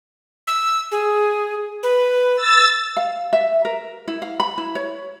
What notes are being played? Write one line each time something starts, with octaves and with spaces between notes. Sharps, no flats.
E6
G#4
B4
E6 A6
F5
E5
A#4
E4
F5
B5
E4
C#5